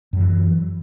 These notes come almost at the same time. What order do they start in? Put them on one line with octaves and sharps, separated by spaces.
F#2 F#3 E3